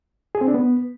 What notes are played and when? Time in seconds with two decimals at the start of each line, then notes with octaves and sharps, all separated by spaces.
0.35 G#4
0.41 C4
0.48 D4
0.54 B3